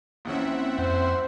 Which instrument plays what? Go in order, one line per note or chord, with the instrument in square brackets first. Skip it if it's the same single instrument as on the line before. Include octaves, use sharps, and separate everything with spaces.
[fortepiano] A#1 E3 C#4 [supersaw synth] C4 E5 F#5
[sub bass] F2 [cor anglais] C5